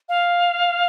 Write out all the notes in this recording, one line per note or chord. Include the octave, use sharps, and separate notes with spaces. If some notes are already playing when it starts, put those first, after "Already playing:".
F5